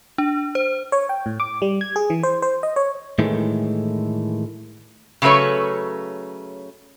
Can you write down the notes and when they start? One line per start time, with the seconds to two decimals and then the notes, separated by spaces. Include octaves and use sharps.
0.18 D4
0.55 C5
0.92 C#5
1.09 G5
1.26 A2
1.40 D6
1.62 G3
1.81 G#6
1.96 G#4
2.10 E3
2.23 C5
2.42 C5
2.63 D#5
2.76 C#5
3.19 A2 D#3 E3 G#3 A3
5.22 C#3 F#3 A3 B4 C#5